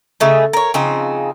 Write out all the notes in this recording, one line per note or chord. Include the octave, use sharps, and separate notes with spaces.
C#3 A3 D#4
A#4 C#5
C#3 F3 C4 D#4